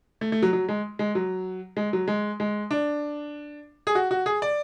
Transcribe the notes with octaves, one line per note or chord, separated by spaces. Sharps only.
A3
A3
F#3
F#3
G#3
G#3
F#3
G#3
F#3
G#3
G#3
D4
G#4
F#4
F#4
G#4
D5